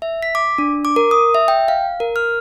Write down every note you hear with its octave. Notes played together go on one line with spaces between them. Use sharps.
E5
B6
D6
D4
D6
A#4
D#6
E5
G5
F5
A#4
F6